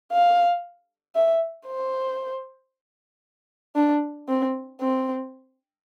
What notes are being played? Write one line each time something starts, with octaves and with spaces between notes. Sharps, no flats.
F5
E5
C5
D4
C4
C4